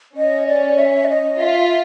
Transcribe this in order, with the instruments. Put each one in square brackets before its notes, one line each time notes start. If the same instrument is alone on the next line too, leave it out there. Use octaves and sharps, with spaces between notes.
[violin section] C#4 [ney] D#5
[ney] D5
E5
D5
D#5
[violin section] F4 [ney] E5